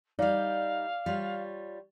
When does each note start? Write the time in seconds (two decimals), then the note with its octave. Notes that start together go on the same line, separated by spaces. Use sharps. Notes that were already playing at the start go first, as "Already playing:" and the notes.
0.19 G3 D#4 D5 F5
1.06 G3 F4 C#5